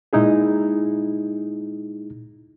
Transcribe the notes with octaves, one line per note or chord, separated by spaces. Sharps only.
A#2 G#3 D#4 E4 G#4